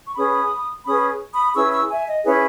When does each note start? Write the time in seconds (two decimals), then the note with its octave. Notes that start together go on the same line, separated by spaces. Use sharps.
0.07 C#6
0.16 C#4 G#4 B4 B5 D#6
0.85 C#4 G#4 B4 B5 D#6
1.32 B5 D#6
1.55 C#4 E4 G#4 B4 C#6 E6
1.72 C#6 E6
1.89 E5 G#5
2.07 D#5
2.25 C#4 E4 G#4 B4 C#5